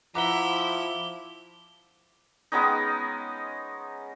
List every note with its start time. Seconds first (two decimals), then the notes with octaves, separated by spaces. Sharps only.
0.15 F3 E4 E5 F#5 A#5 D6 G7
2.52 G#3 B3 C#4 D#4